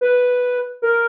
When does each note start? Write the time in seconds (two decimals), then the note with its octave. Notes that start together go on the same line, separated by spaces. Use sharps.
0.01 B4
0.82 A#4